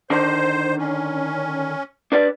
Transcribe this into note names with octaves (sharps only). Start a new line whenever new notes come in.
D3 D#3 D4 C5
C#4
D4 B4 D5